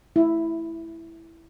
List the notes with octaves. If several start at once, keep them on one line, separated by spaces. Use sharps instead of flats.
E4